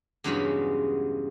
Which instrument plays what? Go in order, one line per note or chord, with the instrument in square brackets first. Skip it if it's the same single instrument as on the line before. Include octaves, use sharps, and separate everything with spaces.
[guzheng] E2 G2 C#3 F#3 G#3 B5